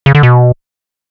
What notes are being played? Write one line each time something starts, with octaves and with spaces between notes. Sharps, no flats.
C#3
D3
B2